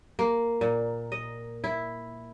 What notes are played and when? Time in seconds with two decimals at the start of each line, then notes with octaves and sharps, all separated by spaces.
0.19 A#3
0.61 A#2
1.12 D#5
1.64 E4